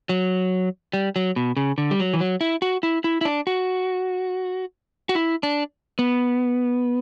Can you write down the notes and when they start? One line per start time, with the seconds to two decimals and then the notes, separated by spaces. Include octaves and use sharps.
0.09 F#3
0.93 G3
1.16 F#3
1.36 B2
1.57 C#3
1.78 D3
1.91 G3
2.00 F#3
2.13 E3
2.20 F#3
2.41 E4
2.62 F#4
2.83 E4
3.04 E4
3.21 E4
3.25 D4
3.47 F#4
5.09 F#4
5.15 E4
5.43 D4
5.99 B3